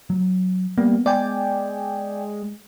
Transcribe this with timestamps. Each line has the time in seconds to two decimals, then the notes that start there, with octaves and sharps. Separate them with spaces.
0.10 F#3
0.78 G3 A#3 B3
1.06 G#3 D5 G5 G#5